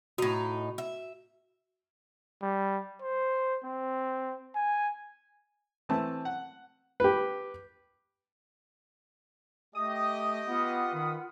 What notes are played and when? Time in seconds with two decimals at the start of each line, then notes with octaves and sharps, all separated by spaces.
0.18 A2 D#4 F#4
0.78 E5
2.42 G3
3.02 C5
3.65 C4
4.55 G#5
5.89 E3 A3 C4 A5
6.25 F#5
7.00 G4 B4
9.75 A3 G4 D#5 D#6
10.47 B3 F4 B4 F#5
10.94 D#3 B5